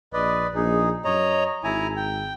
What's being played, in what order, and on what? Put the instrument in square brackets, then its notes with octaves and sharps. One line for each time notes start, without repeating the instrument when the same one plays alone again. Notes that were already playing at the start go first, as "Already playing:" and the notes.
[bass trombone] A#1 [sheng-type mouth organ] B4 D5 D#5
[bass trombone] A#1 [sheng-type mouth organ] D#4 G#4
[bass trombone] F#2 [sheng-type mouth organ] C#5 D#5 A#5
[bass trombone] G#1 [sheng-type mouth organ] E4 G#5 A#5
[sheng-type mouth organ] G5